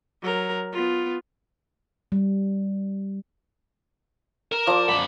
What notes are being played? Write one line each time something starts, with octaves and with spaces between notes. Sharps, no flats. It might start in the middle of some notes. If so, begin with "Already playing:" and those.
F#3 A#4
B3 F4
G3
A#4 E7
F3 D5 D6
F#2 B5